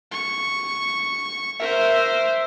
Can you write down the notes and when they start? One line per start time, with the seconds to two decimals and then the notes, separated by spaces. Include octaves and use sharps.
0.12 C#6
1.60 A#4 C5 E5